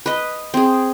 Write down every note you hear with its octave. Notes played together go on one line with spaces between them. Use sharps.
B4 D#5
C4 G#4